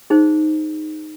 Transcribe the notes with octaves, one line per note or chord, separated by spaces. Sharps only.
D#4 G#4 C5